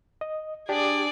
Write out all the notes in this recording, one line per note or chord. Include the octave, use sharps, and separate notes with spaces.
D#5
D4 G4 G#4 D5